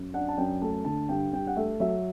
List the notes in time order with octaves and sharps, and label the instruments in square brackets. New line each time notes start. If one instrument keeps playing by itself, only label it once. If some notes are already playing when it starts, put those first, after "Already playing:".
Already playing: [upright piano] F#2
D4 F#5
A5
F#2 G5
A3 A5
D3 A5
G2 G5
G2 G5
F#5
A3 E5
F#3 E5